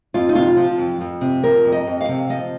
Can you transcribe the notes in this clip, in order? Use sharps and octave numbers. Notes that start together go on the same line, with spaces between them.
F2 F4
D#4
C3 F4
F3
F2
F2
C3
F3 A#4
F2
D#5
F2
F5
C3
F3 D#5